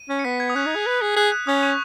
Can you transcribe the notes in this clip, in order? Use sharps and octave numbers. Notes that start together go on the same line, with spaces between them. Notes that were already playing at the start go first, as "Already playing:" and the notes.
Already playing: D#7
C#4
C#7
B3 B6
G#6
D#6
C#4 F#6
D#4
G#4
B4
G#4
G#4 F#6
F#6
C#4 D#6
C#6